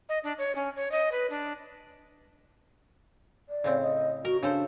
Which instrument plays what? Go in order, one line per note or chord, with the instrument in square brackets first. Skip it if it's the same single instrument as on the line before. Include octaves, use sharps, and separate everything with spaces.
[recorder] D#5
D4
C#5
C#4
C#5
D#5
B4
D4
[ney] D5
[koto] A2 C#3 C4
[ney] D#5
[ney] F#4 [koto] A#4
[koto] C#3 A4 C5 [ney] D4